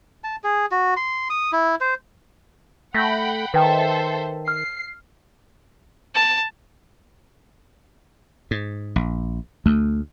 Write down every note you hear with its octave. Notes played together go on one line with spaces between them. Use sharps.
A5
G#4
F#4
C6
D#6
E4
C5
A3 F#5 G5 B5 G6 A#6 B6
D#3 A4 B4 C5 E5 G5 A5
F6 C7
A5
G#2
A#1
D2 A3